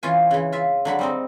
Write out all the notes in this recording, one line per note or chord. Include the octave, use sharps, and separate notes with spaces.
E3 C#4 F4 G#5
C#3 E3
F4 E5
D3 F#3 B5
G3 C4 D#4